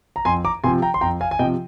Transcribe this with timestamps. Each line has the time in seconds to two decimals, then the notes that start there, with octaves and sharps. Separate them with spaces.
0.16 A#5
0.25 F2 G#5 C6
0.45 A#5 D6
0.64 C3 F3 G#5 C6
0.82 G5 A#5
0.94 C6
1.01 F2 G5 A#5
1.21 F5 G#5
1.31 G#5
1.39 C3 F3 D#5 G5